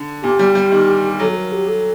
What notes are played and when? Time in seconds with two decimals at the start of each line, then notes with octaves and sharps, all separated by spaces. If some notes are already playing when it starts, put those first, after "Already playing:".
Already playing: D3
0.22 A#2 G4
0.39 G3
0.55 G3
0.72 D#3
1.19 F#3 A4
1.30 A4
1.35 A#4
1.52 G4
1.68 A4